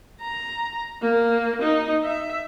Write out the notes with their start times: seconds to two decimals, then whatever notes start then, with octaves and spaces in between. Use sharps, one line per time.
0.21 A#5
1.02 A#3
1.62 D#4
2.04 E5